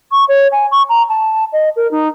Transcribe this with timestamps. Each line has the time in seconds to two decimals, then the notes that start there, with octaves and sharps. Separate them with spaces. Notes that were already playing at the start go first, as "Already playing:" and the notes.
0.12 C#6
0.29 C#5
0.52 G#5
0.71 C#6
0.89 A#5
1.09 A5
1.53 D#5
1.76 A#4
1.91 D#4